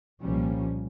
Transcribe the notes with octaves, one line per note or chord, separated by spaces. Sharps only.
C2 A#2 F3 G3 A#3 C#4